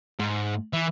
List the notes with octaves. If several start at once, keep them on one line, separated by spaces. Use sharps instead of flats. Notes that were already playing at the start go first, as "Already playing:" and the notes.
G#2
E3